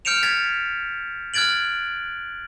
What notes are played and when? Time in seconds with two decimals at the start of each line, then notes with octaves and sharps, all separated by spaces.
0.05 F6 G6 C#7 D7 E7 F7
0.23 F6 G#6 A6 B6
1.34 F6 F#6 G#6 A6 D7 F#7